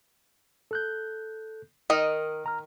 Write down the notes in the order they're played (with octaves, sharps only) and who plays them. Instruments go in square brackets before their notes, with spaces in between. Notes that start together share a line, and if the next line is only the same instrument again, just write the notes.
[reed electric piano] A4 F#6 G6
[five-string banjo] D#3 D#4 D#5 [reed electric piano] A#4 F6
[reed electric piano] A#5 F6